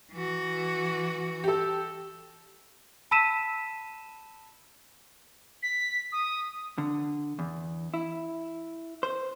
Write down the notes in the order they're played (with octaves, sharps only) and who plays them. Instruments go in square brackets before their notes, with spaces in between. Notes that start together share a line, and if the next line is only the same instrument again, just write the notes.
[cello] E3 F#4
[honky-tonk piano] G4 A4
[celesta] A5 B5 E6 B6 D#7 E7
[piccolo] B6
D#6
[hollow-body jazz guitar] D3
E2
E4
C5